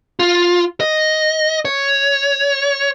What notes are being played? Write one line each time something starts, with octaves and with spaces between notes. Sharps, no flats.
F4
D#5
C#5